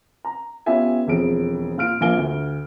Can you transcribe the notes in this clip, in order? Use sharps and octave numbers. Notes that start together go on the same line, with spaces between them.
A#5
B3 C#4 F4 G4 E5 G#5
E1 F2 G#4 D7
A#2 F4 F6 D7
A#1 A#3 F5 G#5 D7 G7
D2